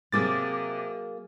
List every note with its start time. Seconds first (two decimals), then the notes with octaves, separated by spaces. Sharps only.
0.12 C3 F#3 A#3 G#4 D6 A6